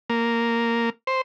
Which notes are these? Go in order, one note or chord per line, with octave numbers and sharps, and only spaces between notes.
A#3
C5